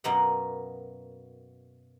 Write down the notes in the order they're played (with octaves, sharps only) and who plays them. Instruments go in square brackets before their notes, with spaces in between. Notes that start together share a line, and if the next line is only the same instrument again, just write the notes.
[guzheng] F#2 B2 A#3 D5 D#5 F#5